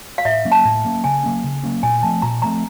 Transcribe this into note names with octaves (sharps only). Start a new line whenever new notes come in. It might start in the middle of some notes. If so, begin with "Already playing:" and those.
F5
A2 E5
F#3 A#3 C#4
A5
A2
F#3 A#3 C#4
C#3 G#5
F#3 A#3 C#4
C#3
F#3 A#3 C#4
A#2 G#5
F3 A3 C4 A5
A#2 A#5
F3 A3 C4 A#5